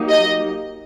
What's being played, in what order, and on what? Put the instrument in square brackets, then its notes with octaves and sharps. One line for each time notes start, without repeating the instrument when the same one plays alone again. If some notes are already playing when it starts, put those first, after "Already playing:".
Already playing: [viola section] F#3 A#3 D#4 G4
[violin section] D#5